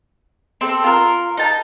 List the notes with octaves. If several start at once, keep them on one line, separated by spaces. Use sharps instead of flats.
C4 A4
F4 A#4
D#4 A5